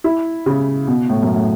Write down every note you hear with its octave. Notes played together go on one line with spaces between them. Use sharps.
E4
C#3
B2
A2
F#2
A2